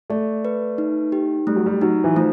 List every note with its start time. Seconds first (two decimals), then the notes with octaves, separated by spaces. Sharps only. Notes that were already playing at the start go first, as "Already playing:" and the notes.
0.10 A3 D5
0.45 B4
0.78 D#4
1.12 G4
1.47 G3 A3
1.56 F#3
1.66 G3
1.81 F#3 D#4
2.04 E3
2.16 F3 A3